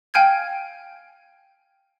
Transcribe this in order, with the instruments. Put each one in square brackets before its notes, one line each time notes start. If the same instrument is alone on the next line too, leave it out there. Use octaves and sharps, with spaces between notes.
[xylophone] F5 G5 G#5 F6 G6 G#6